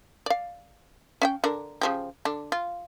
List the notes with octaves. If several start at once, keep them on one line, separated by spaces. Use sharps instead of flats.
D5 F5
C#4 F5 G5
D3 D4 A#4
C#3 F3 G4
D3 D4
F4